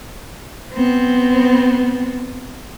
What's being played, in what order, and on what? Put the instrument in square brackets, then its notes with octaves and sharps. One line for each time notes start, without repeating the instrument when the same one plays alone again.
[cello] B3 C4